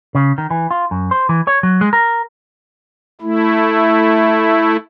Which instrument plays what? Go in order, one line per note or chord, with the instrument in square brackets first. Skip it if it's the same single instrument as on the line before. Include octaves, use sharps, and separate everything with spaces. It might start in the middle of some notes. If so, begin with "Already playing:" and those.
[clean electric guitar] C#3
D#3
E3
F4
F#2
C5
E3
C#5
F#3
G#3
A#4
[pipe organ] A3 E4